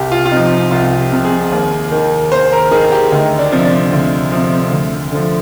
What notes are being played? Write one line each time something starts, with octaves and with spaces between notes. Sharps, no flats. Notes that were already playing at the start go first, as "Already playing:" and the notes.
Already playing: C2 G4
F4
F4
C3 F3 D#4
C2 F4
G4
C3 F3
G#4
D#2
D#3
D#2 C5
A#4
D#3 G#4
G4
D2 D#4
D4
C3 F3
D4
D2
C3 F3
D2
D3 F3